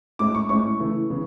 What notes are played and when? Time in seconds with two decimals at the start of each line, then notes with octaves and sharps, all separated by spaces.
0.19 A2 G#3 C#4 E4 D6
0.35 C#6
0.49 A2 G#3 C#4 E4 C#6
0.80 C#3 E3 A3 E4
1.10 C#3 E3